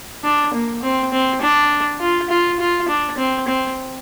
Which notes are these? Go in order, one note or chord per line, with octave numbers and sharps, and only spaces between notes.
D4
A#3
C4
C4
D4
F4
F4
F4
D4
C4
C4